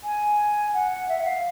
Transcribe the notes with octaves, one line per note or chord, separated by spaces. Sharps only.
G#5
F#5
E5
F#5
F5